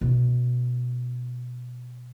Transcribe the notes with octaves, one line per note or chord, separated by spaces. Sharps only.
B2 C#4